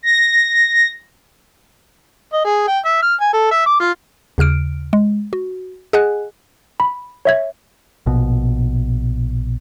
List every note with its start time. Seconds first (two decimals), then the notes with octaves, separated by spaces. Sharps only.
0.03 A#6
2.33 D#5
2.44 G#4
2.68 G5
2.85 E5
3.02 F6
3.21 G#5
3.33 A4
3.51 E5
3.66 D6
3.80 F4
4.38 D#2 C#3 F6 D7
4.93 G#3
5.33 F#4
5.93 G#4 D#5 F#5 G#5 F#6
6.80 B5
7.25 C#5 E5 G#6
8.06 A#1 B2